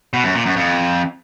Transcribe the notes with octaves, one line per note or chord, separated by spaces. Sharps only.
B2
F#2
A#2
F#2
F2